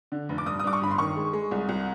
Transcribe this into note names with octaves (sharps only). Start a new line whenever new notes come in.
D3
F1
D6
G2 D#6
D#6
G2 D6
C#6
G1 B5
C6
D#3 C#6
G#3
G#3
C2
C2